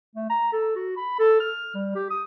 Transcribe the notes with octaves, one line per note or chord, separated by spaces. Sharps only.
A3
A#5
A4
F#4
B5
A4
F6
G3
G4
D#6